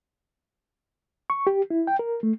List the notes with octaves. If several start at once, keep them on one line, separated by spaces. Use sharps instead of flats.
C#6
G4
E4
G5
A#4
A3